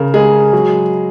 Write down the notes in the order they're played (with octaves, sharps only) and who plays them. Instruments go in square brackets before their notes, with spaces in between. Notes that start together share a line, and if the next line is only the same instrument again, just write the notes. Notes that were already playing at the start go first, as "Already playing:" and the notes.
Already playing: [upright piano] C#3 A#4
G#3 G#4
F#3